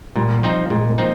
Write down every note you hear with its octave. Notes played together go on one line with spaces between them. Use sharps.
A#2 G3
F3 C4 D#4
A#2 G#3
A#3
F3 C4 D#4